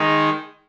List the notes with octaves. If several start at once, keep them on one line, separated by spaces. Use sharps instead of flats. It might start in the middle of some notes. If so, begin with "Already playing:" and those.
Already playing: D#3 G#3 D#4